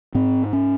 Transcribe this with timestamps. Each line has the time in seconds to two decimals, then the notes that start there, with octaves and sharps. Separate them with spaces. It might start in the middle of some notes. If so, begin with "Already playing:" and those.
0.15 G#2 C4
0.53 C#4